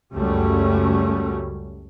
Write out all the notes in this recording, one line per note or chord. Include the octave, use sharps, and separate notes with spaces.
C#2 F#2 G3 A3 C#4